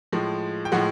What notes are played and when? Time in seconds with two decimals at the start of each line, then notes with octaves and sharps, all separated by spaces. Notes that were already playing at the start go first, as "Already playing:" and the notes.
0.12 A2 F3 G#3
0.65 G5
0.72 A2 F3 G#3 F#5